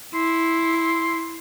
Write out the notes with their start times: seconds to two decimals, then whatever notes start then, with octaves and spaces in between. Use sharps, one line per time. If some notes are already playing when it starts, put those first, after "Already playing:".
0.14 E4 C6